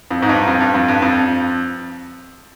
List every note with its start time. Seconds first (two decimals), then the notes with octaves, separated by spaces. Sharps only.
0.10 F2
0.22 G#2
0.29 G2
0.47 F2
0.61 G2
0.74 F2
0.88 G2
1.02 F2